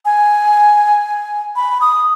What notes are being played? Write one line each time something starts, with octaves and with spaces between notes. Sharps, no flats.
G#5
B5
D#6